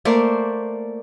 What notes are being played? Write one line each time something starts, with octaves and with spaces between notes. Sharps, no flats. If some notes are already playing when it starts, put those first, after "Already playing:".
A3 A#3 C5 D5